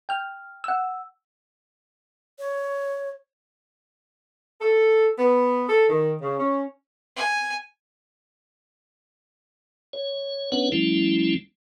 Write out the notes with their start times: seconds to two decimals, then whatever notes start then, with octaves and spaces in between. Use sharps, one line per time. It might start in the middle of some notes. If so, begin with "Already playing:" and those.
0.09 G5 F6
0.64 F#5 E6
2.39 C#5
4.60 A4
5.18 B3
5.67 A4
5.89 D#3
6.21 C#3
6.38 C#4
7.17 G#5
9.93 C#5
10.52 B3 C#4 D4 B4 C#5 F#5
10.72 F3 G3 A3 C#4 E4